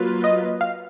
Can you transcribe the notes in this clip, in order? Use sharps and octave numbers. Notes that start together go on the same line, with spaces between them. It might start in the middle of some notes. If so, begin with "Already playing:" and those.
Already playing: F#3 A#3 F4 B4
D#5
F5